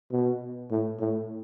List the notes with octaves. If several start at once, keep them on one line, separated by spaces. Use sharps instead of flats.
B2
A2
A2